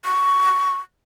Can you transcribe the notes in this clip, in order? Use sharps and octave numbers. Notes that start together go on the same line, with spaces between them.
C#6